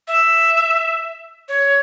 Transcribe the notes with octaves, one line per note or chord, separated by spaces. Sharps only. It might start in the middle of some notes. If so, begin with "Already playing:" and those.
E5
C#5